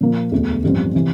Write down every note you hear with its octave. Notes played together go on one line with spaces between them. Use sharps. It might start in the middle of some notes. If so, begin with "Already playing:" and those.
A#2 F3 A#3
E1 D2 D3 A3
A1 G2 F3 C4
C3 E3